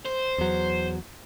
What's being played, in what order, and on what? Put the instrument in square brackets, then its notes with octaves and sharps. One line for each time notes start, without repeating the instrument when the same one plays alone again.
[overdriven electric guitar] C5
[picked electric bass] E2 F#3